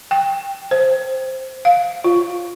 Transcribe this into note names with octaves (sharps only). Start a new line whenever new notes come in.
G5
C5
F5
F4